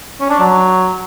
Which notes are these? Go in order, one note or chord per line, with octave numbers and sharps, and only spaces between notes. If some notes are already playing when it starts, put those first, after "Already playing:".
C#4
D4
F#3